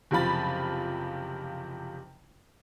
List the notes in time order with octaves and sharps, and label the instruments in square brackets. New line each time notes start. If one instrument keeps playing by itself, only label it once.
[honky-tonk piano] F#1 C3 F3 F4 B5 A6